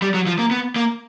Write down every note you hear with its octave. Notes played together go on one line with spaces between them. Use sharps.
G3
F#3
F3
A#3
B3
A#3